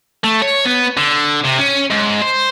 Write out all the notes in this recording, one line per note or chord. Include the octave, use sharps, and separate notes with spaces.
A3
C#5
B3
D3
C3
C#4
G#2
C5